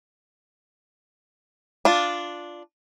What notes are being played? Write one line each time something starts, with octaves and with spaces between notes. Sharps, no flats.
D4 F4